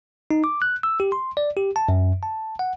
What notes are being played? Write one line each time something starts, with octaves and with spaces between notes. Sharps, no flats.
D#4
D6
F#6
E6
G4
C6
D5
G4
A5
F#2
A5
F#5